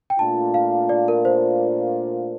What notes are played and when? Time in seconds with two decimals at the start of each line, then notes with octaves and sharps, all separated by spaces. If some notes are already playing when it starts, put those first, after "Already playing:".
0.10 G5
0.19 A#2 A3 D4 F4 A5
0.54 F5
0.89 D5
1.08 A#4
1.25 C5